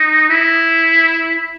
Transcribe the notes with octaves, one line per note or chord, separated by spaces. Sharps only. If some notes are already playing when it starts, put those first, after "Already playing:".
Already playing: D#4
E4